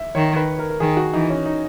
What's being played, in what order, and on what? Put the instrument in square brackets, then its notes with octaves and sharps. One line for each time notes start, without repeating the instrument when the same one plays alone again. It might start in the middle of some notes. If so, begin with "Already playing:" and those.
Already playing: [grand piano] E5
[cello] D#3 [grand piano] C#5
[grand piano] B4
A#4
A#4
[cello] D#3 [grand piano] G#4
[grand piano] F#4
[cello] E3 [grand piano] D#4
[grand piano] C#4
D#4